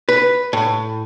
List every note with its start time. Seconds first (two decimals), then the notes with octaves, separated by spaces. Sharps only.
0.09 B4
0.53 A2